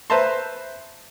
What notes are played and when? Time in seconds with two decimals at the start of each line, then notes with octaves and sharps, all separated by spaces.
0.10 B4 C5 E5 A5 A#5 C6